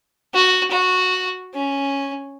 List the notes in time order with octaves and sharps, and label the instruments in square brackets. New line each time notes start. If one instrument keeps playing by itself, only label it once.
[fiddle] F#4
F#4
C#4